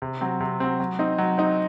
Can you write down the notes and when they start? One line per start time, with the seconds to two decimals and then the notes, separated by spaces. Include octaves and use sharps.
0.02 C3
0.21 F#3 C4
0.40 C3
0.60 F#3 C4
0.80 F#3
0.99 C4 D#4
1.18 F#3
1.38 C4 D#4